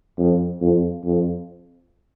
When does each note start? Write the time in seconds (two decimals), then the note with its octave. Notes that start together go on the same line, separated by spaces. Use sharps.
0.18 F2
0.61 F2
1.05 F2